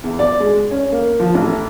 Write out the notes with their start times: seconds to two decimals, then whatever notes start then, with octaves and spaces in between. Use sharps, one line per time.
0.04 E2
0.19 D5
0.40 G#3
0.71 C#4
0.92 A#3
1.20 F3
1.34 A1